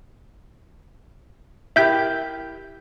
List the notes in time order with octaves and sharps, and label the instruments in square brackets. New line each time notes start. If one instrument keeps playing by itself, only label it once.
[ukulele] E4 G4 A#4 [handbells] E5 G6 B6